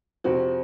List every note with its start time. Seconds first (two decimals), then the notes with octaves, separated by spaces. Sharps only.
0.24 F2 C3 F3 C4 F#4